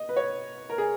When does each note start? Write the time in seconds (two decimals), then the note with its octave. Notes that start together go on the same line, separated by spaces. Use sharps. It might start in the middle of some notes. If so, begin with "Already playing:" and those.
Already playing: D#5
0.09 B4
0.16 C#5
0.70 A#4
0.78 G#4